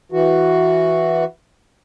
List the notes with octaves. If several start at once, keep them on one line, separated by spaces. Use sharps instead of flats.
E3 F#4